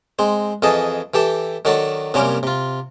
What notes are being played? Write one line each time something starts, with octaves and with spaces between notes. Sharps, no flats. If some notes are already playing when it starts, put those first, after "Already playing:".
G#3 C4
F2 E3 G#4 D#5 A5
E3 G4 A4 E5
D#3 F#3 D4 F#4 A4
F#2 C3 G3 A#3 C4 C#4
C3 F4